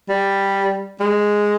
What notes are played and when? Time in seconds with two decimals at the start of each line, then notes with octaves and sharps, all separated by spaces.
0.09 G3
1.00 G#3